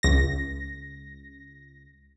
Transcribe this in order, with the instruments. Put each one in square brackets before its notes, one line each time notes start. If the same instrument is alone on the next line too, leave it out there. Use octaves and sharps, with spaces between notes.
[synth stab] C#2 A#6